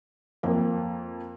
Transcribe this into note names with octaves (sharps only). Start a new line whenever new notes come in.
F2 A#3